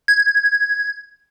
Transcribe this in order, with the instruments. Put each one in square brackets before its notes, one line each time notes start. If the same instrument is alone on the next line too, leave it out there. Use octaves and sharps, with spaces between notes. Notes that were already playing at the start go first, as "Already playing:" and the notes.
[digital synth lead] G#6